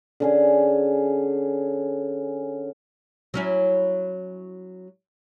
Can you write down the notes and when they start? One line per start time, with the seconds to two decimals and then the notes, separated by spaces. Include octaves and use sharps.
0.20 D3 C#4 G#4
3.34 F#3 C#4 E4